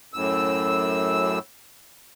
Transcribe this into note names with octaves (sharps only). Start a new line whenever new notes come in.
F#2 A2 E6